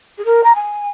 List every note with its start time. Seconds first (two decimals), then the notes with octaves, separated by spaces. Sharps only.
0.18 G#4
0.25 A#4
0.44 A#5
0.55 G#5